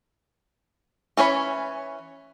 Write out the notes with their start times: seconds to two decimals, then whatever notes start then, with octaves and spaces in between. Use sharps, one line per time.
1.17 E3 C#4 C#5 B5